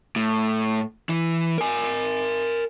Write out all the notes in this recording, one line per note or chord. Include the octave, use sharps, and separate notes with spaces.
A2
E3
A#4 G#5